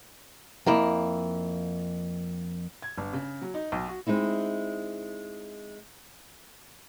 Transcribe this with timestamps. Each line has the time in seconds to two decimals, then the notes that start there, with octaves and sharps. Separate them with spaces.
0.66 F2 A#3 E4
2.82 G#6
2.98 G1
3.13 C#3
3.42 F#3
3.54 D#4
3.72 B1
3.88 F#4
4.07 G#3 C4 D#4 E4